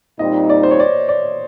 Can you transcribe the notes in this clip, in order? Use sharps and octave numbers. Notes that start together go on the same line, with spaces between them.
A#2 G3 C4 D#4 D#5
D5
C5
C#5
D5
D5